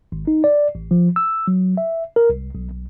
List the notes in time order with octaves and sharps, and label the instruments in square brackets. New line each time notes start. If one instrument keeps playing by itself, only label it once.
[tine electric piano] G#1
D#4
D5
A1
F3
E6
F#3
E5
A#4
C2
B1
B1